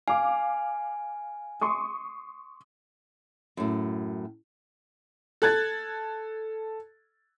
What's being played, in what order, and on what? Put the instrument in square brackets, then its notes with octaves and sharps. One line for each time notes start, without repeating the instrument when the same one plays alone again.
[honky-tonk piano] F5 D6 [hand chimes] G#5
[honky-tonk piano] C6 C#6 D#6
[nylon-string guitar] F#2 A2
[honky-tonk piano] A4 F#6 G#6 A6